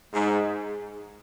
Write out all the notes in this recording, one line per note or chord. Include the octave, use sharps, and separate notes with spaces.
G#2